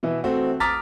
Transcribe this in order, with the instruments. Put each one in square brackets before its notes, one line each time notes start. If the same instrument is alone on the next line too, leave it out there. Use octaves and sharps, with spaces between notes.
[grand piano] B2 E3 E4
A3 C4 F#4
A#5 D6 D#6 F6 A6 B6